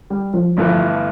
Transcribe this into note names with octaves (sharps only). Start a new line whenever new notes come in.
G3
F3
G1 G2 E3 F3 A3